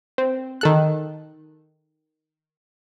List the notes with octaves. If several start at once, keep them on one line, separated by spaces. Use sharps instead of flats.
C4
D#3 A4 F#6